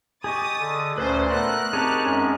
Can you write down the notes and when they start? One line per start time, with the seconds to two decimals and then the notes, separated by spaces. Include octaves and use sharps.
0.24 G4 G#4 D#5 C#6 D#6 A6
0.60 D3
0.98 D2 A#2 C#4 B4 C5 D5
1.30 A3 B3 A#4 F#6
1.73 C4 D#4 G4 G#4 A#4 C#5 A5
2.05 F#2 G#3 C#4